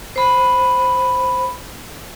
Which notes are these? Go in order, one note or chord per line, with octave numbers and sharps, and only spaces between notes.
C5 B5